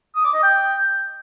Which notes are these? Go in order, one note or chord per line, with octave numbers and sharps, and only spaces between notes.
D#6
D6
D#5
G5